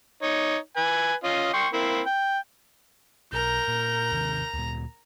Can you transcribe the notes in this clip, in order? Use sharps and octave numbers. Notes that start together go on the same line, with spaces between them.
D#4 C#5
B4 G#5
C#4 F4 D#5
G5 C6 C#6
A#3 C4 E4
G5
B1 A#4 A#5 G6
A#2
D#2 C3 D#3
D2 A#2